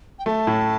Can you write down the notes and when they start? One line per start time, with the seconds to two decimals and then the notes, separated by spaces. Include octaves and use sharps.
0.19 G5
0.26 A3 A5
0.47 A2